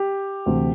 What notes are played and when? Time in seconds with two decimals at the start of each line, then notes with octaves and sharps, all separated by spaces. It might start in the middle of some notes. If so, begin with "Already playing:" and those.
Already playing: G4
0.46 D2 C3 E3